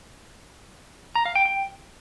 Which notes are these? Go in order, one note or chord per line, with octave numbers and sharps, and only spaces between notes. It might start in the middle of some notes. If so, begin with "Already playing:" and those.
A#5
F5
G5
G5